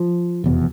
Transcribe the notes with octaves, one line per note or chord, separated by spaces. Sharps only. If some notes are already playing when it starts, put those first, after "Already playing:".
Already playing: F3
F1 E2 B2